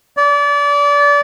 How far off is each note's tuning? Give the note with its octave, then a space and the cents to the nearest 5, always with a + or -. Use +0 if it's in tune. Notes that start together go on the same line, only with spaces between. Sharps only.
D5 -30